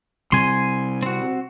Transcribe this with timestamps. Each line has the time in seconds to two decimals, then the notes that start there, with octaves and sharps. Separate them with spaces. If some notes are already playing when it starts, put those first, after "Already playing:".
0.32 C3 G3 G#5 C6
1.03 C4 F#4